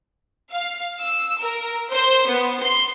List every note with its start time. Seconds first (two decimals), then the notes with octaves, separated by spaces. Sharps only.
0.53 F5
1.02 E6
1.42 A#4
1.92 C5
2.28 B3
2.61 C6